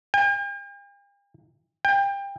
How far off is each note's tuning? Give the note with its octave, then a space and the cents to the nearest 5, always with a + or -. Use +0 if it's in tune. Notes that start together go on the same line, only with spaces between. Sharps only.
G5 +45
G5 +25